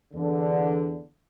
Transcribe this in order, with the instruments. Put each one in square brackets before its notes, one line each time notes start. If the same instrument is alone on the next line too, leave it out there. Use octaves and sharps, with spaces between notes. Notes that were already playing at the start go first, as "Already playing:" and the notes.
[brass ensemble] E2 D3